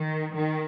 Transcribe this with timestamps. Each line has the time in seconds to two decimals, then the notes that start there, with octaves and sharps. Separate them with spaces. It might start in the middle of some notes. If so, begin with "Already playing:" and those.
Already playing: D#3
0.36 D#3